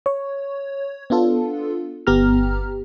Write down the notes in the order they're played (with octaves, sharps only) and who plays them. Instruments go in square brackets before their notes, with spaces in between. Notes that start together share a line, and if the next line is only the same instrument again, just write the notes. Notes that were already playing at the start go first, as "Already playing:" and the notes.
[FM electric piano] C#5
B3 D4 F4 A4
G1 B3 G4 A#5 F6